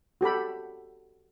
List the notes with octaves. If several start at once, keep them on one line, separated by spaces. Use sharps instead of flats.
F#4 G4 A4 B5